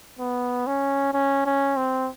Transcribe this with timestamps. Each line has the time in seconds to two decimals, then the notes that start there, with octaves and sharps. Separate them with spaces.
0.19 B3
0.67 C#4
1.14 C#4
1.46 C#4
1.77 C4